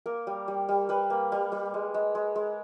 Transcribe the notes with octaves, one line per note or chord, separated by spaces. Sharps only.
A#3 A#4
G3
G3
G3
G3 B4
A#3
G3
G3
G#3
G#3
G#3
G#3